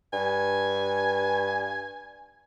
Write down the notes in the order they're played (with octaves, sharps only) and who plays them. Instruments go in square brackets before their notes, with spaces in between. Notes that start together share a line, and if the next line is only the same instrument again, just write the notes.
[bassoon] G2 [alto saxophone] G#5